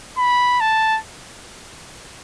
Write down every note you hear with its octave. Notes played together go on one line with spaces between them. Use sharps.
B5
A5